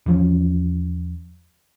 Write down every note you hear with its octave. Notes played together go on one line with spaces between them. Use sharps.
E2 F3 C#4